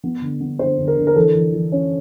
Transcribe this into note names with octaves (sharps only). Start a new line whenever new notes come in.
B3
D3
B3
D3 C5
D3
A#4
D3
A#4
E3 A4
E3
E3
C#4